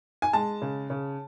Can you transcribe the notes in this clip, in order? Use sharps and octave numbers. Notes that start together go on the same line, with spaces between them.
G#5
G#3 A5
C#3
C#3